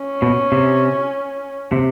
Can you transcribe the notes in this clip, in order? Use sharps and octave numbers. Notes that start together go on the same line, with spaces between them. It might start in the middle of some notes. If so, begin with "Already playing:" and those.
Already playing: C#4
B2
C3
C3